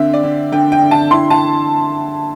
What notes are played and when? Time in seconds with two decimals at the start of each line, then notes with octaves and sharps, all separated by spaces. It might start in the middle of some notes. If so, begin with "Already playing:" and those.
Already playing: D3 C4 E5
0.13 D5
0.23 D3
0.52 D3 G5
0.72 G5
0.82 D3
0.91 A5
1.11 E4 C6
1.30 A5